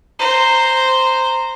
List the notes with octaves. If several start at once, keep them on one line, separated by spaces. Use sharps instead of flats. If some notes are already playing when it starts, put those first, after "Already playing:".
C5 A#5